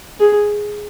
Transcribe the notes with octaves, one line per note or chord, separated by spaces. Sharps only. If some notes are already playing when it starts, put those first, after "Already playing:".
G#4